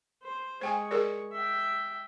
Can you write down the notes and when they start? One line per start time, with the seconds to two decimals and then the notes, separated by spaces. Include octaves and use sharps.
0.23 C5
0.61 G#3 C5 G5 G#5 C#6
0.91 G#4 A#4 D5
1.33 E5 G5